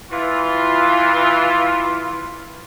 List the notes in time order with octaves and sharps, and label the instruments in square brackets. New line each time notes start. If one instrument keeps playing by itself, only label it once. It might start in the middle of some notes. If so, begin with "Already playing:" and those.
[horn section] E3 F4